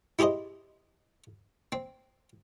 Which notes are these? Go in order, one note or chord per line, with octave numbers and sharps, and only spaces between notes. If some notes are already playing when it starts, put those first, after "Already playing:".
E4 G4 G#4 C5 D#5
C4